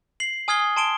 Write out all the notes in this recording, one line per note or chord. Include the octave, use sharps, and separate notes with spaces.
C7 F#7
G#5 D#6 F6 G#6 C7 G7
A5 C6 D7 E7 G7